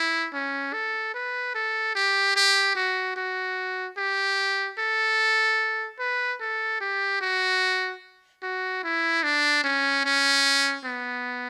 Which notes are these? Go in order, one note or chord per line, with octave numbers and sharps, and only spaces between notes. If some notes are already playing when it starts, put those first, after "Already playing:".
Already playing: E4
C#4
A4
B4
A4
G4
G4
F#4
F#4
G4
A4
B4
A4
G4
F#4
F#4
E4
D4
C#4
C#4
B3